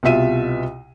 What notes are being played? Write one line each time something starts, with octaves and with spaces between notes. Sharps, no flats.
C2 B2 F4 E5 D#7